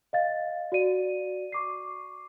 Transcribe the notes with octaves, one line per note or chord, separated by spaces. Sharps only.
D#5 F5 A6
F#4 D5 D#7
C#6 D6 C7